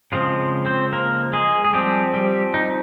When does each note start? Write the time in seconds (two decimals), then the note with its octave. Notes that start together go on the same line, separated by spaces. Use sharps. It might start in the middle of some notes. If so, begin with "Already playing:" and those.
0.12 C#3 F3 G#3 C4 F4
0.65 C4 C5
0.93 A#3 A#4
1.33 G#3 G#4
1.65 G#4
1.73 F3 G3 C4 G4
2.14 G3 G4
2.54 D#4